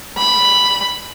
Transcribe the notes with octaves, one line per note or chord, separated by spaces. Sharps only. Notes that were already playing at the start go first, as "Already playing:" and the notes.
B5